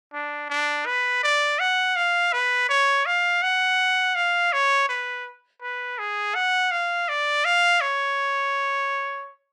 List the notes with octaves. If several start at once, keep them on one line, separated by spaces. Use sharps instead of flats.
D4
D4
B4
D5
F#5
F5
B4
C#5
F5
F#5
F5
C#5
B4
B4
G#4
F#5
F5
D5
F5
C#5